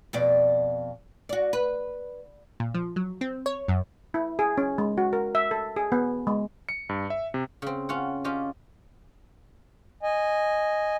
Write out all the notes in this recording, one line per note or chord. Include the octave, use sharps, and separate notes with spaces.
F2 B2 D5
F#4 D5
B4
A#2
F3
F#3
C4
C#5
F#2
E4
G#4
C#4
G#3
F#4
A#4
E5
A4
G#4
B3
G#3
C#7
G2
E5
C3
C#3 C4
C#4 F4 F#5
C#4 F4 G4 D#5
D#5 G#5